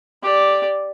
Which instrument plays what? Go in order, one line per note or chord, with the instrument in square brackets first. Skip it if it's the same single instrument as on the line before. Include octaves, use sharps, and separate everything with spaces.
[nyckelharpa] G4 D5